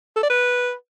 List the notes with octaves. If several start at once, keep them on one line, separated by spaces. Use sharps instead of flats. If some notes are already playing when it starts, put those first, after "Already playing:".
A4
D5
B4